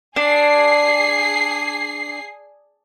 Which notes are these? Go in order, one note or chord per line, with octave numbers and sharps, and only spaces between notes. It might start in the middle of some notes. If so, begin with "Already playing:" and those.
D4 G#4 D5 C7